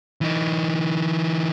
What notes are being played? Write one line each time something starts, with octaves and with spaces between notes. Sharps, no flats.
E3 D#4